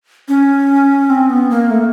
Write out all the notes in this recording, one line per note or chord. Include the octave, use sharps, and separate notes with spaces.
C#4
C4
B3
A#3
A3